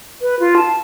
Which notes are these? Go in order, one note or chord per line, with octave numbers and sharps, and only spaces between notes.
B4
F4
A5